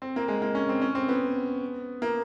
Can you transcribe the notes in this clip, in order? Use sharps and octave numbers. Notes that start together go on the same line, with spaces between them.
C4
A#3
G#3
A#3
C#4
C4
C#4
C4
B3
A#3